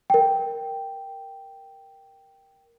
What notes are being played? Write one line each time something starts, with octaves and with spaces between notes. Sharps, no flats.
A#4 G5